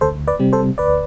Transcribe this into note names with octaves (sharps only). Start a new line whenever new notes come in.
D2 A4 C5
B4 D5
C3 G3 C4
A4 C5
D2 B4 D5